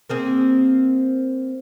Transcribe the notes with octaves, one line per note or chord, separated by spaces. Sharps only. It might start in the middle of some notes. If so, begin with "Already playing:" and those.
A#3 C4 G#4